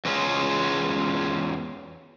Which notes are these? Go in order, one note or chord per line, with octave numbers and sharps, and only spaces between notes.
E2 G#3 C#4 F4 G#4 C#5